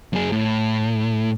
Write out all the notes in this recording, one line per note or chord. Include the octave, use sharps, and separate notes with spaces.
F#2 G#4
A2